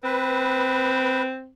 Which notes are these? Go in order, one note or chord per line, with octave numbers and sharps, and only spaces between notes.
C4 B4